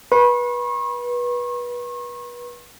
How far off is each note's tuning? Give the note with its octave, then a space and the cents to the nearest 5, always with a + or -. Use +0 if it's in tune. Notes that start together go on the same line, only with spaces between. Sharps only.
B4 -30 C#6 -40